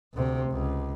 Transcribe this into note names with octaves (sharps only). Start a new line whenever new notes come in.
D2 C3
C#2